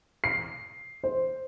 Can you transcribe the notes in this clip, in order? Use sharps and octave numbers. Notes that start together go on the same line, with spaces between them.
C7
C5